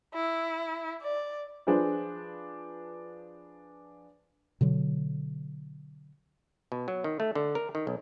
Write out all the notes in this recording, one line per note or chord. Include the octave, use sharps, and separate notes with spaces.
E4
D5
F3 D4 G#4 B4 C5
B2 D3 F#3
B2
F#3
D#3
A3
D3
A#4
D#3
B1